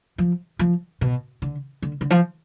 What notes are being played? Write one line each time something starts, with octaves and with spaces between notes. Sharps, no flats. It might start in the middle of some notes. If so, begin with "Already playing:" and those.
F3
F3
B2
D3
D3
D3
F3